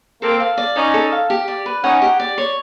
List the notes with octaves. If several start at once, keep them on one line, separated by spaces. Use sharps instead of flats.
A#3 C4 A4
F5
D5
C#4 D#4 A4
A4
F5
G4
D5
B4
C#4 D#4 F#5
G4
D5
C#5